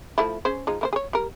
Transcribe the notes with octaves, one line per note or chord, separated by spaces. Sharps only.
F3 A3 E4
C#4 G#4 C5
F3 G#3 D#4
A#3 E4 C5
G#4 C#5
G3 A#4